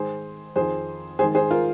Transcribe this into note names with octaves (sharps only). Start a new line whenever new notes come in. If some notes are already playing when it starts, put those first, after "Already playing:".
Already playing: G#2 D#3 G#4 C5
F2 D#3 G#4 C5
G#2 D#3 G#4 C5
G#4 C5
F4 A#4